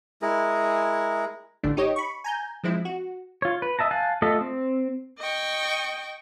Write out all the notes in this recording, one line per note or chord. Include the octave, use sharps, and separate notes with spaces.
G#3 E4 G#4 A#4
A1 D3 A3 D4
D#4 G4 C#5 D#5
B5 C#6
G#5 A#5 G6
F3 G#3 C4 E4
F#4
F4 C#5
B4
D#5 E5 A5 A#5
F5 G#5 A5 F#6
A3 F4 A4 D#5 E5
C4
D#5 G5 C#6